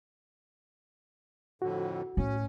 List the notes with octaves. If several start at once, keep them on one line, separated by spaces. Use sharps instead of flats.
F2 A2 D3 F#4
A2 C#4